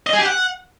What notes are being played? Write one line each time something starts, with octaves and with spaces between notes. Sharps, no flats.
D#5
G#4
G4
F#5